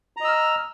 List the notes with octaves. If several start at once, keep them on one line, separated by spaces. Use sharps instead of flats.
D#5 A#5 E6 F6